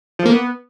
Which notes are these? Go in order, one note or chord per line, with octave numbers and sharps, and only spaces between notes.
F3
A#3
B3